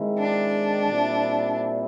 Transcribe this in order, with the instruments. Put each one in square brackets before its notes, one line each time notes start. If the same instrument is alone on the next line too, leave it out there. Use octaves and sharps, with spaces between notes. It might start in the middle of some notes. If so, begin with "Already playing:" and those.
Already playing: [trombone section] D#3 G#3 C4 E4
[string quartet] D4
[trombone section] A#2 G3 C4 E4